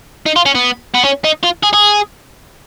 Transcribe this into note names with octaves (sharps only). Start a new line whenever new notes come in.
D#4
F4
C#4
B3
B3
C#4
D#4
F4
G#4
G#4